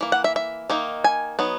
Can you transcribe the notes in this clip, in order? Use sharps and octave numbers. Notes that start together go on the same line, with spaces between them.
E3 A#3
F#5
E5
E5
D#3 A#3 D#4
G#5
F#3 B3 D#4